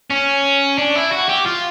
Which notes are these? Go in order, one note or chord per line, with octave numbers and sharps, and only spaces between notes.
C#4
D4
E4
F#4
G4
F4